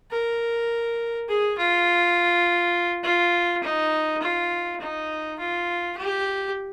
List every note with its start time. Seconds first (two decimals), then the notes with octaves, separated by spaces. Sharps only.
0.11 A#4
1.28 G#4
1.57 F4
3.03 F4
3.63 D#4
4.22 F4
4.80 D#4
5.39 F4
5.97 G4